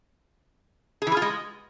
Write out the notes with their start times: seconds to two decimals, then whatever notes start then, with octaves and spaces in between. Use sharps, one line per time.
1.02 G#4
1.07 E3
1.12 G#4
1.17 F4
1.22 G#3